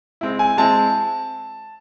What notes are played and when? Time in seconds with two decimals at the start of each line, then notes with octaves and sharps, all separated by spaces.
0.21 G#3 C4 E4
0.39 G#5
0.57 G#3 C4 E4 A5